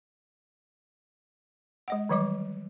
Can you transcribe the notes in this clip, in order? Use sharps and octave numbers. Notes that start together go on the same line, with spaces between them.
G#3 D#5 F#5
D#3 E3 F#3 G3 D6